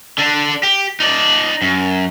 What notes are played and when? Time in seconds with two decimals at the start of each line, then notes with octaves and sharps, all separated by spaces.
0.18 D3 D4
0.63 G4
1.00 D#4 D5
1.62 F#2